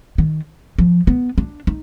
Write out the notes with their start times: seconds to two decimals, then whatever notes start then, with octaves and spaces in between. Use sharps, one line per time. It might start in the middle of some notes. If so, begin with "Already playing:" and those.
0.18 D#3
0.79 F3
1.07 B3
1.38 D4
1.67 D#4